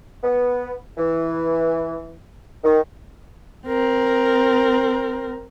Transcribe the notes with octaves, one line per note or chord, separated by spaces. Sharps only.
B3
E3
D#3
C4 A#4